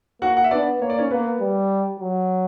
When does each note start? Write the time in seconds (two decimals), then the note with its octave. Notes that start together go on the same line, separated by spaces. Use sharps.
0.21 A#3 F#4 F#5
0.37 F#5
0.44 E5
0.51 B3 D4 D5
0.81 A#3 C#5
0.90 D5
0.99 C#4 C#5
1.11 A#3 B3 B4
1.40 G3
2.00 F#3